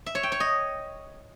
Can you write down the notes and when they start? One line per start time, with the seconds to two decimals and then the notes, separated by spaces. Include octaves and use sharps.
0.06 E5
0.15 C#5
0.23 G5
0.32 C#5
0.40 D#5